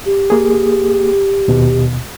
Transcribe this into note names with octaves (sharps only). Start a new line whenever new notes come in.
G4
A#3 G#4
D#2 B2